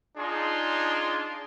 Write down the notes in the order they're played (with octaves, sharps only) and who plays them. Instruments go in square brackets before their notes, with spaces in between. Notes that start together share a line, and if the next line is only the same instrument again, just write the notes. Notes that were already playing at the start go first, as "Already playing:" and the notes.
[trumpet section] D4 D#4 F4 G#4 C6